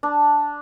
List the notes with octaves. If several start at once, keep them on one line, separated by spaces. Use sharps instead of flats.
D4